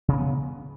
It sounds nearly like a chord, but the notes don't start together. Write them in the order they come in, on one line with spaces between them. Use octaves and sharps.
C#3 A#3 B3